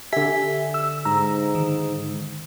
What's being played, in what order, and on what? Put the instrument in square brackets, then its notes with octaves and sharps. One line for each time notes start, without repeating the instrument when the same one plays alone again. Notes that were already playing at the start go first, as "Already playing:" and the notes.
[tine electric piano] D3 B6 [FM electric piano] G4 E5 G#5
[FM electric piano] E6
[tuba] G#2 [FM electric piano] A#5 E6
[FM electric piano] D#3